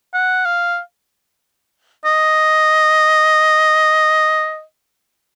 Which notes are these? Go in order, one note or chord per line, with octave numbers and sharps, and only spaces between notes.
F#5
F5
D#5